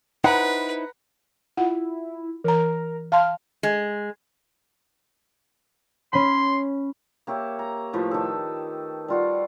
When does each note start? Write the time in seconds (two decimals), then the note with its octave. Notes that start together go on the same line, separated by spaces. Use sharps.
0.24 D#4 E4 B4 C5 F#5 A#5 B5
1.57 E4 F4 F#5
2.44 E3 A#4 A#5
3.12 F5 A5 C6 F6
3.63 G#3
6.13 C#4 B5 C6
7.27 A#3 G4 C#5 E5
7.59 A#5
7.93 A2 F3 B4
8.11 D#3 A4
9.08 G3 F4 F#4